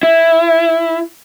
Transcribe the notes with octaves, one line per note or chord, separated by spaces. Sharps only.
E4